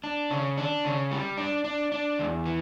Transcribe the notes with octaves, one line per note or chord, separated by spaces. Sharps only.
D4
C#3
D4
C#3
G3
D4
D4
D4
E2
E3